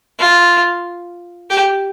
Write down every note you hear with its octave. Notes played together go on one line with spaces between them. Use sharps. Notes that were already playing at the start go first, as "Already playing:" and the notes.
F4
G4